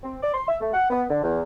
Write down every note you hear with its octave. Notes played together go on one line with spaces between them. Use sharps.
C4
D5
C6
E5
A3
F#5
B3
D3
E2